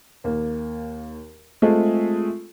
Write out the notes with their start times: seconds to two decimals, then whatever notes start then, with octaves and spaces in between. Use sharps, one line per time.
0.24 D#2 A#3
1.62 G#3 A3 C4 F4 G#4 A4